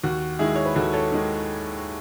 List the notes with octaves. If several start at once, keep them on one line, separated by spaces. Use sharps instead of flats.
D#2 F#4
D#3 G#3 E4 G#4
C#5
B4
D#2 F#4 A4
A4 C#5
D#3 G#3